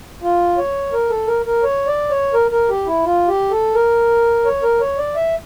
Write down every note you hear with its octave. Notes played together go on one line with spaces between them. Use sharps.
F4
C#5
A#4
A4
A#4
A#4
C#5
D5
C#5
A#4
A#4
G4
E4
F4
G4
A4
A#4
C#5
A#4
C#5
D5
E5